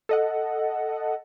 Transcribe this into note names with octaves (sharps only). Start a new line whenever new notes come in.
A4 D#5 F#5